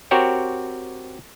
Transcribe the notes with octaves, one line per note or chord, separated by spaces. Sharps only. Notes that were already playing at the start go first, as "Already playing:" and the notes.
C4 F#4 G4 A#4 C#5